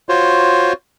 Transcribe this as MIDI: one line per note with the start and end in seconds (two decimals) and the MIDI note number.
0.09 0.73 65
0.09 0.73 66
0.09 0.73 72
0.09 0.73 73